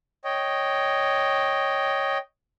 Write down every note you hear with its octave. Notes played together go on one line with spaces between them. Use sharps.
C#5 D#5 G5